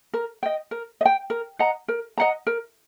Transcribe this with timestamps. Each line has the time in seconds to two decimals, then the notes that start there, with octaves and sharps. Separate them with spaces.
0.14 A#4
0.43 D#5 G5
0.71 A#4
1.01 D#5
1.05 G5
1.30 A#4
1.59 D#5 F#5 A#5
1.88 A#4
2.18 D#5 F#5 A#5
2.47 A#4